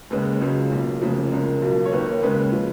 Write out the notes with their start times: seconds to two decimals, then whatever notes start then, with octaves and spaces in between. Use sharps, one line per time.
0.10 D#2 C#3 G#3 B4
0.41 C#2 C#3 F#3
0.71 B1 A#2 F#3
1.01 F1 D#2 C#3 F3 A#3
1.31 C#2 C#3 G#3 A#4
1.62 B1 B2 F#3 A#3
1.85 C#5
1.92 D#2 D#3 A#3 B4
2.22 D#2 C#3 G#3 B4
2.52 C#3 F3